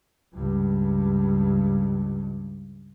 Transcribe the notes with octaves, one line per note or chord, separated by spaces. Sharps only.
C#2 G2